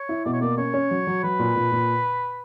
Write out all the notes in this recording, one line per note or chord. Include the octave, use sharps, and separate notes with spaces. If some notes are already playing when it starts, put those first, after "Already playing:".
Already playing: C#5
E4
B2 D5
C#5
A#3 D5
C#4 C#5
C#4
F#3
F#3
F#3 B4
A#2
A#2
A#2